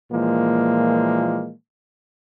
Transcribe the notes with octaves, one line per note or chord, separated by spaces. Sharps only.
A#2 E3 F3 G#3 A#3